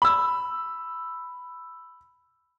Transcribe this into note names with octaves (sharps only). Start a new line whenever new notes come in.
B5 E6